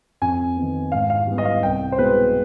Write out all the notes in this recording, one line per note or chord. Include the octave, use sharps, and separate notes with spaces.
F2 G#5
D#3 B3
G#2 F5
F5
G3 B3
D#5
F5
C2 G5
C5
B2 G#3 B3 B4